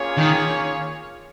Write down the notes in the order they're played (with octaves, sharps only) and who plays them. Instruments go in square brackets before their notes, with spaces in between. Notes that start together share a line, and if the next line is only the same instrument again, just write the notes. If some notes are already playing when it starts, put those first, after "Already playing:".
Already playing: [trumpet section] A#3 C#4 F4 G#4 C#5
[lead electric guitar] D#3